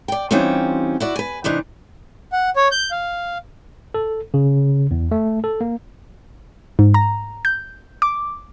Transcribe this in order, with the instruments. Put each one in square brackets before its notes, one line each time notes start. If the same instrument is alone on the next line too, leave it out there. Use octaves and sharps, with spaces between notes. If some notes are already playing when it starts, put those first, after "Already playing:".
[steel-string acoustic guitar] D5 G5
E3 G3 C4 C#4 D#4 F4
E4 F#4 D5
B4 G#5
C3 E3 D4 D#4
[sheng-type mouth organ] F#5
C#5
G6
F5
[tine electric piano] A4
C#3
E2
A3
A4
A#3
[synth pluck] G#2
A#5
G6
D6